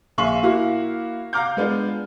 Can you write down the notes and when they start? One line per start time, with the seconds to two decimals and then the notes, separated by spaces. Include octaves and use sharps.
0.18 A#1 E5 F5 C6 C#6 F#7
0.43 A#3 E4 F#4 F5
1.33 F5 F#5 A#5 D6 F6 G6
1.57 G#3 B3 D4 F4